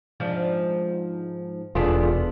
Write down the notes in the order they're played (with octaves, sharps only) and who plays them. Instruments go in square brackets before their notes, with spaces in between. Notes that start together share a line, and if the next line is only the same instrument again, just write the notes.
[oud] G#2 F3 D4
[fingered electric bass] E1 [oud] B3 D4 [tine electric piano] F4 G#4 A4